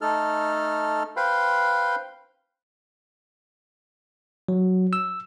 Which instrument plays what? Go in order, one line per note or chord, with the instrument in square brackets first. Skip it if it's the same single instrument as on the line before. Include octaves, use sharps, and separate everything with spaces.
[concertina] A3 D#4 A4 F6
B4 C5 F5 G5 B5 C6
[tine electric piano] F#3
E6